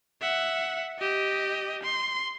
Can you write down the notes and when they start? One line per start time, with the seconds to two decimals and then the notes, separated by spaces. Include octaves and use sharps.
0.21 E5 F#5
0.99 G4 D#5
1.83 C6